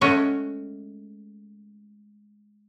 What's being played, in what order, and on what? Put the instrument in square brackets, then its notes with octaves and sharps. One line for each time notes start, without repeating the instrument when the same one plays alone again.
[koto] G#3 A3 C#4 F#4 C#5